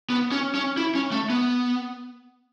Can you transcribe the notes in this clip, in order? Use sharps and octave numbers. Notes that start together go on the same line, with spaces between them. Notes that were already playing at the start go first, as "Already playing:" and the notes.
B3
C#4
C#4
E4
C#4
A3
B3